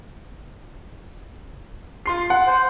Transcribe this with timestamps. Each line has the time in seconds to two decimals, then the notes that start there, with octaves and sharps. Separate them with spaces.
2.06 F4 C6 C7
2.30 F#5
2.47 C5